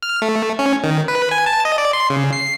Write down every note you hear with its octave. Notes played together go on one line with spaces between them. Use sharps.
F6
A3
C#4
D#3
B4
G#5
A5
D#5
D5
C6
C#3
C7